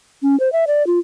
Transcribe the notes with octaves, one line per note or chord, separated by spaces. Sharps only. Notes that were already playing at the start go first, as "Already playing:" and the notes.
C#4
C5
E5
D5
F4